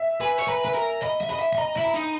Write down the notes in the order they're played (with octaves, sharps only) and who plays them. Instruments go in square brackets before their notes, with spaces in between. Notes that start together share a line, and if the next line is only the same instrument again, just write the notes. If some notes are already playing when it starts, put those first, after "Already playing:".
Already playing: [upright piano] E5
[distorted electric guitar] B4 [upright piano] G#5
[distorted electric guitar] C#5
[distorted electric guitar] B4 [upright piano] A#5
[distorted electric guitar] B4
A#4
[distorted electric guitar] D#5 [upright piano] B5
[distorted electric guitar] E5
[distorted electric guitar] D#5 [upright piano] B5
[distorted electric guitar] E5
E5
[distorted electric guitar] D#5 [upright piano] A#5
[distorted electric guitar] E4
[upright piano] B5
[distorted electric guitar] D#4